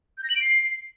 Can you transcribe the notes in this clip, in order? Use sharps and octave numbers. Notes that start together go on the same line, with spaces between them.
G6
A#6
F#7
D7
C7